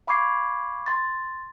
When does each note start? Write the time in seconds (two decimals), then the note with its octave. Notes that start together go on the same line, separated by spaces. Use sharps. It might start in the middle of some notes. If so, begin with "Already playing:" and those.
0.07 F5 B5 C#6 D6 G#6 C7
0.86 C6 A6